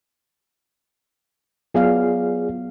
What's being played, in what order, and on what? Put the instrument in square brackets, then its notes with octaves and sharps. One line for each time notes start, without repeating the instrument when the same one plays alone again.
[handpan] F#3 B3 F5 [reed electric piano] F4 G#4 D5